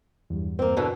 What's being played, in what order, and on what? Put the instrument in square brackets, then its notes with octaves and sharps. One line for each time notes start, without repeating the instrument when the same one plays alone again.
[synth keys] E2 G2
[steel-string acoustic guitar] A#3 C4
B2 D3 E3